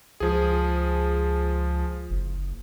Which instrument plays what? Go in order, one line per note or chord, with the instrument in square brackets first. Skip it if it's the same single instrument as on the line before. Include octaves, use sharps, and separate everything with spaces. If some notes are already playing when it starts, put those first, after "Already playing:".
[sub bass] C#2 [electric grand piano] F3 G#4
[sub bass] F#1